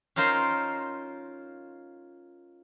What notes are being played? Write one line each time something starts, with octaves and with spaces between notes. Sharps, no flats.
C#4 D#4 F4 A#4 C5